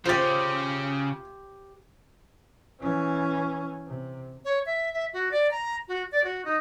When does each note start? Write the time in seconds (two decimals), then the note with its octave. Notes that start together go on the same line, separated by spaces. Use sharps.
0.05 C#3 F4 G4 C5 A6
2.80 E3 C#4
3.87 C3
4.45 C#5
4.66 E5
4.93 E5
5.13 F#4
5.31 D5
5.51 A#5
5.88 F#4
6.12 D5
6.24 F#4
6.45 D#4